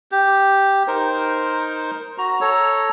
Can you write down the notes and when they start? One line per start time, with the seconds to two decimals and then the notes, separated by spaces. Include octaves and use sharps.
0.12 G4
0.88 D#4 A#4 C5
2.18 F#4 A#5
2.41 A4 C#5 A#5